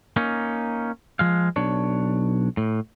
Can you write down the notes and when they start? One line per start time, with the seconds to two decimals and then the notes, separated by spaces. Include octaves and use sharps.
0.16 A#3 C#4 D#4
1.19 F3 G#3 F5
1.56 B1 D4 C#5
2.57 A2